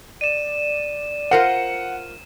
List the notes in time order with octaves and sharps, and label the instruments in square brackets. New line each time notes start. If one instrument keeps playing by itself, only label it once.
[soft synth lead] D5 [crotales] D#7 E7
[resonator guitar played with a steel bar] F4 A#4 C5 [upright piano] F#5 [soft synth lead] C#7